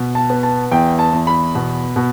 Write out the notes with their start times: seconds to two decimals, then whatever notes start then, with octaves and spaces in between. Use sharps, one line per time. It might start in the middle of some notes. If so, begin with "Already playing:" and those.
Already playing: B2
0.15 A5
0.30 B3
0.43 A5
0.72 E2 G5
0.99 A5
1.13 E2
1.27 B5
1.55 B2
1.96 B2